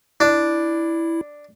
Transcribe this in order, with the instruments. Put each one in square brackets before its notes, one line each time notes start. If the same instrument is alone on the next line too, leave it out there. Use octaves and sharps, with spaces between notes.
[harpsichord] D4 [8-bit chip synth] E4